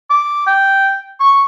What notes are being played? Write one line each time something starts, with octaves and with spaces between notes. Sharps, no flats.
D6
G5
C#6